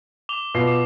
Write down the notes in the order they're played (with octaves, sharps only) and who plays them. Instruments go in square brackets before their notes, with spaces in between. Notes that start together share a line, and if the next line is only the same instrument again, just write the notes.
[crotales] D6 F7 G7
[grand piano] B2 F4 C7
[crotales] D6